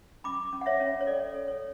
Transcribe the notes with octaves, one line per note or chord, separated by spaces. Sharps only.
C#4 B5 D6
C#4
F#5
C#5 E5
C#4
C#5
A4 D5
A4
C#5